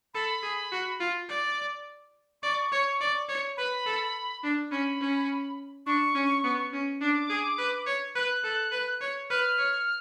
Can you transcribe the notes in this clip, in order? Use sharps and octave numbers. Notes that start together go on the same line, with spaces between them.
A4 B5
G#4
F#4
F4
D5
D5 C#6
C#5
D5
C#5
B4 B5
A4
D4
C#4 B5
C#4
D4 C#6
C#4
B3
C#4
D4 D6
G#4
B4
C#5
B4 F#6
A4
B4
C#5
B4 F6
C#5